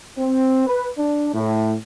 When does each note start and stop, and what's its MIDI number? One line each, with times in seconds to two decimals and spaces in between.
0.18 0.65 60
0.67 0.87 71
0.99 1.28 62
1.34 1.75 45